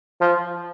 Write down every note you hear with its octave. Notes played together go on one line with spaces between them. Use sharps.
F3